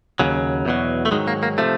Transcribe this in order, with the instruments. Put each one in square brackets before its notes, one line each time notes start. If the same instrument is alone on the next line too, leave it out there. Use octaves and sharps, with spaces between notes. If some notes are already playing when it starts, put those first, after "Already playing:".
[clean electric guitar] D#2 C#3 F#3
E2 B2 F#3
A3
G#2 D#3 F#3 G#3
A#3
A#3
C3 F3 A3